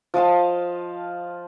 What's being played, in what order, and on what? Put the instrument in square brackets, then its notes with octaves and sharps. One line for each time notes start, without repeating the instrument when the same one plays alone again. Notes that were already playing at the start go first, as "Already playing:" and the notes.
[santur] F3 D#5 F5 A5